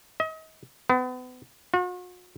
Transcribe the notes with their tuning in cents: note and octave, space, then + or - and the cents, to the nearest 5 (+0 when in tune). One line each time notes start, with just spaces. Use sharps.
D#5 +35
B3 +35
F#4 -45